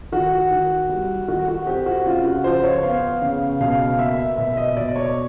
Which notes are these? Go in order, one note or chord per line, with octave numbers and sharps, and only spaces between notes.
D#3 F#4
D#3
G3
D#3 F#4
F#4
C4 G4
F#4
C#3 F4
F#4
F3 C5
C#5
B3 F5
C#3
B2 F5
A#3 E5
B2 E5
D#5
B2 D5
C#5